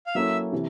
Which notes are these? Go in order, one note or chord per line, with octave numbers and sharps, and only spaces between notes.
F5
F#3 A#3 C#4 E4 A4 E5
C3 E3